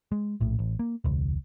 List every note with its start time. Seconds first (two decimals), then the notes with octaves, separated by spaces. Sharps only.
0.12 G#3
0.41 A#1 A2
0.59 A1
0.79 A#3
1.04 E1 C#2